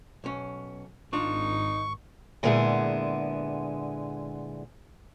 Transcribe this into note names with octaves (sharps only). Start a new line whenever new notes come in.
B1 C#4
G#1 D4 D#4 F4 C#6
A#2 D3 G#3 B3 E4 G#4